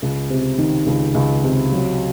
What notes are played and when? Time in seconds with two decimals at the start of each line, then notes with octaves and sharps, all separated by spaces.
0.02 C#2
0.30 C3
0.58 D#3
0.86 C#2
1.15 C#2
1.43 C3
1.72 F#3